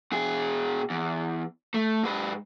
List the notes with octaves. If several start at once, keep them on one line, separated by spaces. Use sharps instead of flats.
B2 G#4
E2
A3
G#2 B4